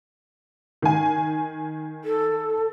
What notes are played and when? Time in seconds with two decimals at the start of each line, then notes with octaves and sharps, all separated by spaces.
0.82 D#3 G#5
2.04 A4